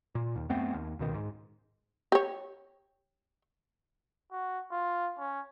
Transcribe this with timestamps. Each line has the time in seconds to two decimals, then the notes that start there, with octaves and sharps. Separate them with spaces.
0.15 A#2
0.36 D#2
0.49 F#2 A3 B3 C4
0.74 D#2
0.99 C#2 B2 D#3
1.14 G#2
2.12 G4 C#5
4.32 F#4
4.72 F4
5.19 C#4